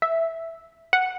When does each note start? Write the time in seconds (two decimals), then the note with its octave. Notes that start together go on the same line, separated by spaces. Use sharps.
0.02 E5
0.93 F#5